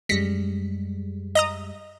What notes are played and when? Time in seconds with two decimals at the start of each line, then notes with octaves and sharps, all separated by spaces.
0.09 F#2 G3 G#3 A#6 B6 C#7
1.35 D#5 A#5 D#6